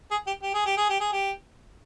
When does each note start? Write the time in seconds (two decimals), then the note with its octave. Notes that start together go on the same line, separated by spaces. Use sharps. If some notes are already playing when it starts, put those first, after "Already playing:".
0.11 G#4
0.27 G4
0.42 G4
0.54 G#4
0.66 G4
0.77 G#4
0.89 G4
1.00 G#4
1.12 G4